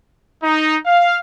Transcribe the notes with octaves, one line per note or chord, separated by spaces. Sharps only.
D#4
F5